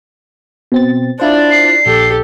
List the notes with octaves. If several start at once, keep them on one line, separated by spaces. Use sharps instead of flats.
B2 C4 A6
D4 E4 F4 C5 D5
C7
A#1 G4 A4